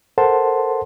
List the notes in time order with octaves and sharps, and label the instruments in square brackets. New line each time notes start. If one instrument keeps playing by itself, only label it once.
[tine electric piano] A4 A#4 C5 F#5 A5 C6